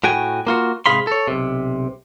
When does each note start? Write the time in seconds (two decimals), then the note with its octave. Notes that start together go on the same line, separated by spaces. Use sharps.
0.04 A2 F#4 G5 G#5
0.47 A#3 F4 F#4
0.86 G#2 C3 G#4 F5 B5 C6
1.07 A4 C#5
1.28 B1 C3